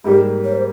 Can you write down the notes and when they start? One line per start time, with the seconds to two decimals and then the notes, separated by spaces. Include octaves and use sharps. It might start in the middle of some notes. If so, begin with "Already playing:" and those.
0.04 G#2 G3 A#3 G4
0.44 C#5
0.52 C5